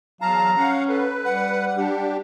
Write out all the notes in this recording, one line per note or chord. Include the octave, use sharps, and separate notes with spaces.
E2 F#3 F5 A5 A#5
C#4 F5 F#5
A4 B4
G3 F#5
D4 G4